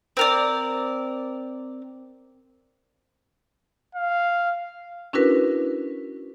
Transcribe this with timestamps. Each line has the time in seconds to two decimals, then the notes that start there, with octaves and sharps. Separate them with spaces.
0.17 C4 A#4 D5
3.95 F5
5.13 C#4 D4 E4 F#4 A#4 B4